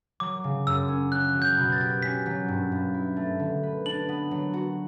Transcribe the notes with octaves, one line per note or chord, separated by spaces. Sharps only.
F#3 D6
C#3
F#2 E6
C#4
C#4 F#6
F#3
G6
B2
A6
G4
C#4 B6
F#3
G2
G2
E4
A3
D3
B4
D4 F#7
B3
F#3
F#4